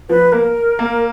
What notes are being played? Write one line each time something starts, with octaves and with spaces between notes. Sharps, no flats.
F3 B4
A#3 A#4
A#3